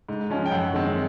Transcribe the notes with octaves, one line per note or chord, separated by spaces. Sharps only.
G#2
F3 G#3 C#4
G5
F#2 F#5
D#3 G#3 C4